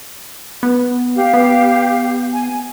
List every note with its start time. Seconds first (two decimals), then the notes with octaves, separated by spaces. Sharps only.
0.63 B3
1.15 G4 F5
1.33 B3
2.33 G#5